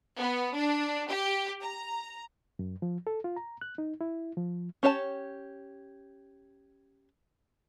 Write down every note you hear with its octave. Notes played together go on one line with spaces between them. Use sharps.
B3
D4
G4
A#5
F#2
F3
A4
F4
A#5
F#6
D#4
E4
F3
C#4 G4 C#5 E5 A5